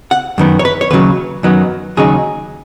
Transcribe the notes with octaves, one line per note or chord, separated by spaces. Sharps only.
F#5
F#2 D#3 B3
C#5
B4
C#5
D#2 C#3 F#3 B4
F#2 D#3 F#3 B3 D#4
D#2 C#3 F#3 D#4 G#4